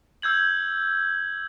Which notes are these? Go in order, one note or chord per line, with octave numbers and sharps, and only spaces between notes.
E6 G6 G#6 F#7